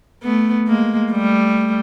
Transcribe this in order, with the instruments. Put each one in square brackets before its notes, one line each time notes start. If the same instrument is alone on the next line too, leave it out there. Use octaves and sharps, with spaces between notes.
[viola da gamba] A3 B3
G#3 A#3
G3 A3